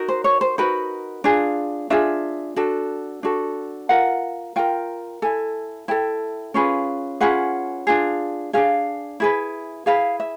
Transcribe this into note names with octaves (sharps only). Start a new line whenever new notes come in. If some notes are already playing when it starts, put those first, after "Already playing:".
Already playing: D#4 F#4 A#4
C5
C#5
C5
D#4 F#4 A#4 B4
D4 F4 G#4
D4 F4 G#4 E5
D4 F#4 A4
D4 F#4 A4
F4 A#4 F#5
F4 A#4 G5
E4 A4 G#5
E4 A4 G5
C#4 F4 G#4 B4
C#4 F4 G#4 B4 F#5
D4 F4 G#4
D4 F4 G#4 F5
E4 G#4 B4
E4 G#4 B4 F5
E5